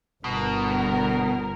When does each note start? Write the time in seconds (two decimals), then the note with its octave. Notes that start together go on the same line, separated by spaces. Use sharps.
0.24 G1 B2 A#4